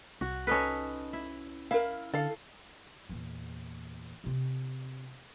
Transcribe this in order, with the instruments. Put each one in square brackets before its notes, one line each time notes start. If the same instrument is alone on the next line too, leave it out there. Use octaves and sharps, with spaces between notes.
[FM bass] C2 [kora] F#4
[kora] C#4 D#4 B4 [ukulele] A4 A5
[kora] E4
[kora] E4 [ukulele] A#4 F5
[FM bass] D3 [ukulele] A4 F5
[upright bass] E2 A#2
C3 C4